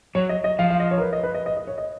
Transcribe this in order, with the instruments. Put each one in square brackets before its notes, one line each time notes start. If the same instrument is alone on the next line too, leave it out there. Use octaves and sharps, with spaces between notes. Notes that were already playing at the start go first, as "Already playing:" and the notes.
[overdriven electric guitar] F#3 [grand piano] C#5
[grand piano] D#5
D#5
[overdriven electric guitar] F3 [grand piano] F5
[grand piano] F5
D#5
C#5
A#4
B4
D#5
B4
D#5
D#5
D#5
C#5
D#5